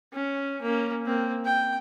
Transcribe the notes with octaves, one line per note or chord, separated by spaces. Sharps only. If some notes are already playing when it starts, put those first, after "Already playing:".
C#4
A#3 C#4
A#3 C4
G5